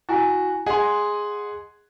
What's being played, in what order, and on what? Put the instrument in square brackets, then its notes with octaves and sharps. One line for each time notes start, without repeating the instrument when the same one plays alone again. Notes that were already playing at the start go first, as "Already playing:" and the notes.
[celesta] E4 G#5 [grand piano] F#4 A#5
[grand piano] G#4 F#5 G#5 [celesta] D#5 C6